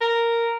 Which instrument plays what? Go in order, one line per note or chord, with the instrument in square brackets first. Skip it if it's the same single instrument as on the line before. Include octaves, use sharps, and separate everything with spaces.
[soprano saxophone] A#4